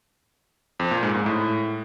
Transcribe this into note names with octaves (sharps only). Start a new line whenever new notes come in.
F2
A#2
G#2
G#2
A2